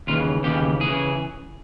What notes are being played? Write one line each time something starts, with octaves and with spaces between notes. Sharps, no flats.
D#2 C#3 E3 F4
D#2 C#3 E3 G4
C#3 E3 G#4